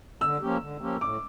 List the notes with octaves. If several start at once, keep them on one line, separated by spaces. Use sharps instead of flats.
D3 E6
F3 A#3 C#4 G4
D3
F3 A#3 C#4 G4
A2 D6